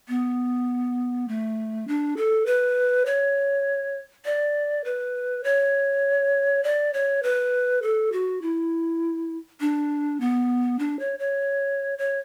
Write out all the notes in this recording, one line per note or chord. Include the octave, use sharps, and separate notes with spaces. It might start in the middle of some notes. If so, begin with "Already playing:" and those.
B3
A3
D4
A4
B4
C#5
D5
B4
C#5
D5
C#5
B4
A4
F#4
E4
D4
B3
D4
C#5
C#5
C#5